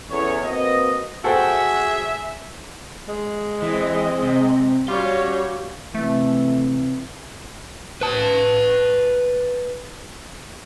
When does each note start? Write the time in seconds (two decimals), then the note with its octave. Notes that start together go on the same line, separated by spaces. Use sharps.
0.10 E2 E3 C#4 A4 C#5
0.44 A#3 C4 F#4 B4 D#5
1.24 F#4 G#4 A4 C5 E5 G5
3.08 G#3
3.62 E3 C4 D#5
4.22 C3
4.88 G3 C#4 F#4 C#5 F5 C6
5.95 C3 E3 A3
8.01 B4 A5